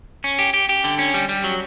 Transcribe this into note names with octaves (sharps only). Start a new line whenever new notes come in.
C#4
G4
G4
G4
D3
C#4
G3
G3
F#3